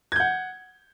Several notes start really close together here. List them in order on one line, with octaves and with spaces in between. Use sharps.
G#6 G6 F#5